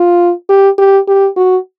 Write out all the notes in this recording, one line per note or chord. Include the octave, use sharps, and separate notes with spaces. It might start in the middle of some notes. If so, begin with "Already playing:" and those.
Already playing: F4
G4
G4
G4
F#4